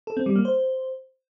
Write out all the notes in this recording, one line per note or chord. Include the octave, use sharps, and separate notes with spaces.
A4
C4
G3
A#3
C5